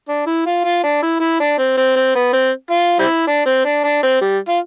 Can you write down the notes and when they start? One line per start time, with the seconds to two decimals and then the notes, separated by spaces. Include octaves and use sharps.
0.08 D4
0.26 E4
0.46 F4
0.64 F4
0.83 D4
1.02 E4
1.20 E4
1.40 D4
1.58 C4
1.77 C4
1.96 C4
2.15 B3
2.33 C4
2.71 F4
2.99 G3 C4 E4
3.27 D4
3.46 C4
3.65 D4
3.84 D4
4.03 C4
4.21 G3
4.48 F4